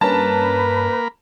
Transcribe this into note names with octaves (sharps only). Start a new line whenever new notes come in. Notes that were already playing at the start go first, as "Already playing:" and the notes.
G2 A#3 C#4 A#4 B4 A5 B5